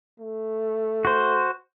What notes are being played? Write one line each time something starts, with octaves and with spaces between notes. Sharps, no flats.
A3
F#4 C5